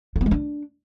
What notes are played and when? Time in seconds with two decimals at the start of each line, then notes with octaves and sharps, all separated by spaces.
0.16 A3
0.21 B3
0.26 G#3
0.31 D4